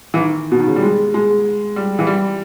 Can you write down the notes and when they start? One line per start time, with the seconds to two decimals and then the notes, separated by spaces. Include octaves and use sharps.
0.14 E3
0.20 D#3
0.52 B2
0.60 D#3
0.67 C#3
0.76 G3
0.83 G#3
1.14 G#3
1.76 G3
1.99 E3
2.07 G3